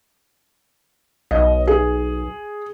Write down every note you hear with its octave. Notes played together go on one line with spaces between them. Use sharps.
B1 D#5
G#4